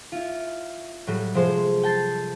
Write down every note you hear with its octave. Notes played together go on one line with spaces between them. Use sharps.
E4 F4
A2 F#3 G3
C3 F3 G#3 C5
G5 A5 A6 C7